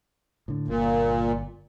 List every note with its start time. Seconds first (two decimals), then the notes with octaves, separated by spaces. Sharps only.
0.48 A2 D3
0.68 G1 A#2